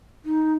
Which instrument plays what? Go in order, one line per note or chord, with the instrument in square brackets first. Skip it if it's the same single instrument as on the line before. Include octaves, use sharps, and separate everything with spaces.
[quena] D#4